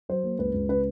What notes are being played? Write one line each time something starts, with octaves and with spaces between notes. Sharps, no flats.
F#3 C5
A#3
C#2 B4
C#2
C#3 B4